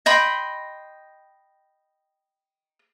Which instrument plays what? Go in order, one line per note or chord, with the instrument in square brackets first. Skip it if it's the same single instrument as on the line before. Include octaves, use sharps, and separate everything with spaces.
[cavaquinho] D#5 G5 B5 C6